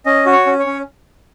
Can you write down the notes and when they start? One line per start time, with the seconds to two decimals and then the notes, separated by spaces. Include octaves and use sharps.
0.06 C#4 D#5
0.26 F#4
0.32 C#5
0.46 C#4
0.59 C#5
0.66 C#4